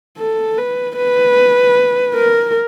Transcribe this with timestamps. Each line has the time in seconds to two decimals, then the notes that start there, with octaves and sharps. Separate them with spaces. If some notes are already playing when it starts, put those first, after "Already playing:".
0.18 A4
0.58 B4
0.97 B4
2.15 A#4